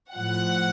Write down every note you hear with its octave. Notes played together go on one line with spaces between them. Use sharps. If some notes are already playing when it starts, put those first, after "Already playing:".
A2 F3 F#5